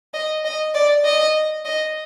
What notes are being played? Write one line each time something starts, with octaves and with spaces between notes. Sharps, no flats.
D#5
D#5
D5
D#5
D#5